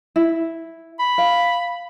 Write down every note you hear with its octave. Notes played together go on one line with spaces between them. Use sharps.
E4
B5
F5